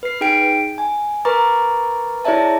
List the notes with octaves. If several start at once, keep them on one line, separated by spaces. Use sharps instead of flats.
B4 C7
D#4 G#4 G5 B6 D7
G#5
A#4 B4 A#5 C#6 D6 A6
E4 G#4 C#5 D5 E5 A5